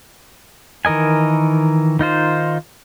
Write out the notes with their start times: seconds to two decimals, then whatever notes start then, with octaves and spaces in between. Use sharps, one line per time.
0.85 D#3 E3 A#4 D#5 G#5
1.99 D#3 D#4 F4 C5